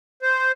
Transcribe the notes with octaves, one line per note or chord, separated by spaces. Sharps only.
C5